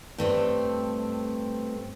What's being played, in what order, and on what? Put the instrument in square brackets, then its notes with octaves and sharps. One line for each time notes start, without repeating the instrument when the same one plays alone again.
[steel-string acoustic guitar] G2 A3 C4